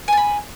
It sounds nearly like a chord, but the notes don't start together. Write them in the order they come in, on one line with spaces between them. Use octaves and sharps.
G#5 A5 B5